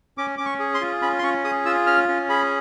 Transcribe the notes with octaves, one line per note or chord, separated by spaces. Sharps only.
C#4 D6
C#4 D6
C#6
G#4
C6
F4
C#4 B5
C6
C#4 C#6
G#4 D#6
F4 E6
C#4 F6
C#4
G#4 B5